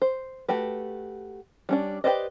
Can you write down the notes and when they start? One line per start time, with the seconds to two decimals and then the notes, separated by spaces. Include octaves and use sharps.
0.02 C5
0.48 A3 F#4 G4 B4
1.69 G3 C#4 D4
2.04 G4 B4 C5 D5 D#5